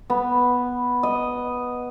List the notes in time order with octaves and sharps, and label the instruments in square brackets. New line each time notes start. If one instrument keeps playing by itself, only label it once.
[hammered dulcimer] B3
D#5